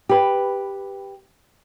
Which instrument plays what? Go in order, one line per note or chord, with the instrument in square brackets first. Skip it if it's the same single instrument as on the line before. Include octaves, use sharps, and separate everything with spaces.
[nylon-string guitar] G4 B4